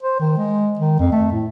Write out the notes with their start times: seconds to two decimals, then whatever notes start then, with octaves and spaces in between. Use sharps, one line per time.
0.03 C5
0.20 D#3
0.38 G#3
0.79 D#3
0.99 F2
1.12 A3
1.32 A2